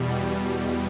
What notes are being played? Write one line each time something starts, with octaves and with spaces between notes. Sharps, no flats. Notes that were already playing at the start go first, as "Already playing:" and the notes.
Already playing: E2 B2 G3